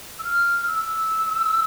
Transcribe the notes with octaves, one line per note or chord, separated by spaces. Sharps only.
E6
F6
E6